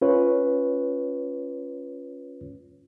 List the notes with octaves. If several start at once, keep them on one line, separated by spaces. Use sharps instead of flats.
C#4 F4 B4 C#5